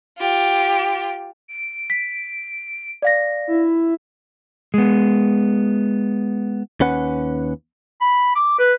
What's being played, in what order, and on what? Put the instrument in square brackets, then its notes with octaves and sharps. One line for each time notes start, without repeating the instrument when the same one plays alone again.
[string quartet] F4 G4
[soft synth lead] D7
[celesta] B6
D5 F5 A#6
[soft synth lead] E4
[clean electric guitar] G#3 B3
D#2 C#4 B4 F#5
[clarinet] B5
D6
B4